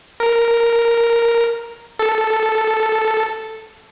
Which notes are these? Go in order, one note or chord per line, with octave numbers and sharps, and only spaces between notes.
A#4
A4